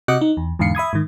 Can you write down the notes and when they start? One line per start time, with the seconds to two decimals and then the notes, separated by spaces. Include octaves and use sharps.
0.08 C3 F#4 D#5 D6 F#6 C#7
0.21 D#4
0.37 E2
0.59 E2 G#2 D3 F5 C7 C#7
0.75 E5 B5 D#6 G#6
0.93 G#2 D#3